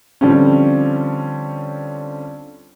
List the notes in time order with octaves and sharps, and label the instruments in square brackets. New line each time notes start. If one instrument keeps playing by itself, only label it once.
[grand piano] D3 F3 G3 C4 C#4